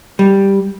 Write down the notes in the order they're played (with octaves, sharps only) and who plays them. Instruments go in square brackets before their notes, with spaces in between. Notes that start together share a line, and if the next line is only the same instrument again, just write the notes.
[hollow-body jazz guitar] G3